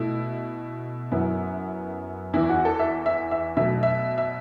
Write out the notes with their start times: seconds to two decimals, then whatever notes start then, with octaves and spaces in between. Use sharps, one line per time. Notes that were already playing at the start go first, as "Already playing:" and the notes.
Already playing: B2 A3 E4
1.12 F#2 F#3 B3 E4
2.33 E2 E3 B3 E4
2.49 F#4
2.65 A4
2.79 E5
3.06 E5
3.31 E5
3.57 B2 F#3 A3 E5
3.83 E5
4.18 E5